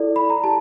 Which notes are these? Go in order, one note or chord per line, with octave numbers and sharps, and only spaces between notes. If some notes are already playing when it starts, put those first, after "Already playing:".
Already playing: E4 A4 D5
B5
A#5
G4 A5